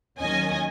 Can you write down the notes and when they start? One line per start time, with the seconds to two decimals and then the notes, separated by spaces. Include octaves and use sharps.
0.19 D#2 D#3 F#3 C#4 D#5 G#5